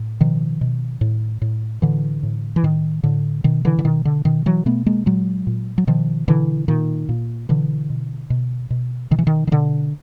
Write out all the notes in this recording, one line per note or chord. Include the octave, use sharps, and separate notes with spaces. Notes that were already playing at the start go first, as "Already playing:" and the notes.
Already playing: A2
B2 D#3 F3
B2
A2
A2
A2 D3 E3
A2
E3
A2 D#3
A2 D3
B2 D#3
D3 E3
D3
B2 D#3
D3
B2 D#3
E3 F#3
B2 A3 B3
G#3 A#3
A#2 F#3 G#3
A#2
F#3
B2 D#3 F3
B2 D3 E3
A#2 D#3
A#2
B2 D3 E3
B2
B2
B2
B2 D#3
E3
D#3
D#3
B2 D3